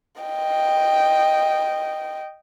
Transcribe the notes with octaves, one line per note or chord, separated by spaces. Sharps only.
D#5 G5